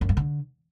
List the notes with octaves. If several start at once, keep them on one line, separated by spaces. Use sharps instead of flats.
F#2
G2
D3